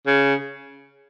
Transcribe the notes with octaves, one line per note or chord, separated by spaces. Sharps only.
C#3